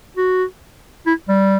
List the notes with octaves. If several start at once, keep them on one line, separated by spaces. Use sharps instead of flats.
F#4
E4
G3